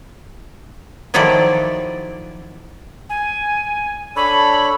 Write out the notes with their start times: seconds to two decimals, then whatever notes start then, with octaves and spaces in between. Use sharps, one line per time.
1.14 D#3 F3 F#3 E4 A4 D5
3.10 G#5
4.16 D4 A4 C#5 B5